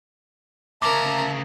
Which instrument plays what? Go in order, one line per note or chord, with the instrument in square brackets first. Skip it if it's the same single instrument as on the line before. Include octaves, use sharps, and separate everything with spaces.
[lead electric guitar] D2 C#3 [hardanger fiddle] A#4 [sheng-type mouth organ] E5 A5 A#5 [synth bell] D6